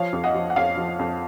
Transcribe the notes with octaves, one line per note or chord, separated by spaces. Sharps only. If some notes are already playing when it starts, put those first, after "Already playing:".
Already playing: F3 C#5 F5
F2
D#5 F#5
F3
F#5
F2 C#5 F5
F3
F2